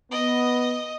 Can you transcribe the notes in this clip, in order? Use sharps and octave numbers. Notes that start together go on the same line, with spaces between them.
B3 D#5